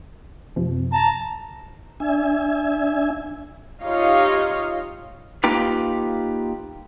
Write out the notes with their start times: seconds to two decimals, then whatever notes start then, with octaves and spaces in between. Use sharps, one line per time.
0.56 F#2 C3 F3
0.93 A5 A#5
2.00 D4 E5 G#5
3.82 D#4 F4 G4 C#5 D#5 F5
5.44 A#3 D#4 F4 G4 B4